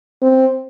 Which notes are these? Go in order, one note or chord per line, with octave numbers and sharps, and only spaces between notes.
C4